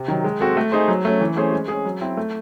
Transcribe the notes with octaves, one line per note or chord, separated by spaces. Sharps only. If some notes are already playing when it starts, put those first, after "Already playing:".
Already playing: C3
D#3 F#3
G#3
C4 F#4 A4
A3
D#4 G#4 C5
F#3
A3 C#4
E3
A3 C#4 G#4 C5
G#3
C#4 G#4
F#3
C4 E4
A3